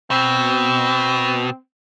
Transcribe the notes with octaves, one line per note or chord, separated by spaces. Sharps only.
B2 C4